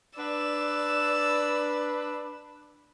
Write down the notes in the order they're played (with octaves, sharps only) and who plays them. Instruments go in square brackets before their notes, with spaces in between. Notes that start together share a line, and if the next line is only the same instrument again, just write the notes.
[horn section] D4 B4 [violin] D5 E6